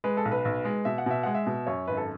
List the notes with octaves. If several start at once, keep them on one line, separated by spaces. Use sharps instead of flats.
G#3 B4
A4
B1
B4
B1
G#3
B2 E5
F#5
B2 E5
G#3 F#5
E5
B2
F#2 C#5
G#1 B4
A4